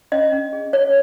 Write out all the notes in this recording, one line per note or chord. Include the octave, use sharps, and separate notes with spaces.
C#4 D#5
C#4
G#4
C#5